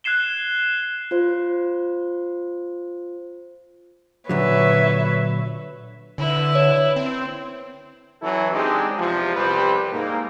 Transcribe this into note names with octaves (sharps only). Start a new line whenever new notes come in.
F#6 G#6 C7 E7 G7
F4 C5
A#2 D3 F#3 B4 C#5 E5
D3 E4 B4
C#5
C4
E3 F#3 C#4 E4 A4
G#3 C4 D4 D#4 G4
E2 C3 F3
C2 G3 C4 G4 B4
G#2 A#3